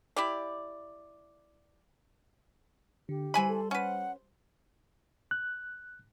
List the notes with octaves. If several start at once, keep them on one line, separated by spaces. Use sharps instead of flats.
E4 G4 D5
D3 G4
E3 G3 C5 G#5 B5 C6
A4
C#4 B4 F#5
F#6